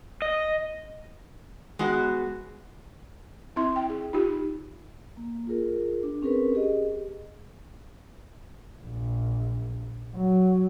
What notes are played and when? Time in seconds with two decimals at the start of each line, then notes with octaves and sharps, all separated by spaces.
0.22 D#5
1.79 G#3 B3 F#4
3.56 C4 E4 E5 C6
3.76 G5
3.90 G#4
4.13 D#4 F4 G4
5.17 A#3
5.47 F4 G#4 A#4
6.03 D4
6.22 C4 C#4 G#4 A#4 B4
6.54 G4 G#4 D#5
8.82 A#1
10.15 F#3